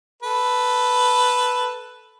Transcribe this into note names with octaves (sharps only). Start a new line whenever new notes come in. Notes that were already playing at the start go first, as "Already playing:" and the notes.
A4 B4